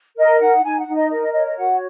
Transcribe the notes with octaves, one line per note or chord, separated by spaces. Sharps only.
A#4 D#5
D#4 F#5
D#4 G#5
F#5
D#4
D#5
A#4 D#5
D#5
C#5 D#5
D#5
F#4 F#5